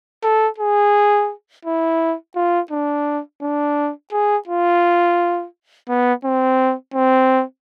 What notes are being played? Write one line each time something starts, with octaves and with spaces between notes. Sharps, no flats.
A4
G#4
E4
F4
D4
D4
G#4
F4
B3
C4
C4